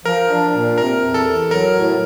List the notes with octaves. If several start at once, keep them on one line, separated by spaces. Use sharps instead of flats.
F3 A#4
D4
A#2
C3 A#4
E2
A4
E2
F#3 A#4
A2